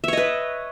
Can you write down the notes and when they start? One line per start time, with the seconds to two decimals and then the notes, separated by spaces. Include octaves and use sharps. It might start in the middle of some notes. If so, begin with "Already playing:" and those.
0.04 E5
0.08 C#5
0.13 D#5
0.17 B4